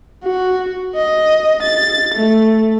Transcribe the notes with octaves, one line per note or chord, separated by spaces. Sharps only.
F#4
D#5
A6
A3